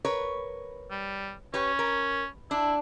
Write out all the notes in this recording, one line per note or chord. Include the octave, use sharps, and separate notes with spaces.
A#4 B4 C#5
G3
C#4 G4 B4 C#5
A#4
D4 E4